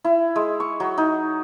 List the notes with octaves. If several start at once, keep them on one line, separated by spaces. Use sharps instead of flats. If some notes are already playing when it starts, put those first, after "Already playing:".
E4
G#3
C#6
F#3
D#4